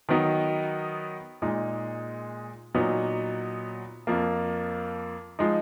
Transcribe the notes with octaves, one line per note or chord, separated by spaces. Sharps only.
D#3 F#3 B3 D#4
A#2 G#3 D#4
A#2 F#3 B3 D#4
F2 F3 A#3
F3 G#3 D#4